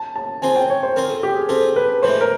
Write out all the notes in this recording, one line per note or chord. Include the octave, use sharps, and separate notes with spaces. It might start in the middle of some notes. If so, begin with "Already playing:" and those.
Already playing: A5
A5
C4 F4 G#4 G#5
G5
C#5
C5
C4 F4 G#4 A#4
A4
G4
G#4
C4 F4 G#4 A4
B4
A2 E3 G#3 C5
A#4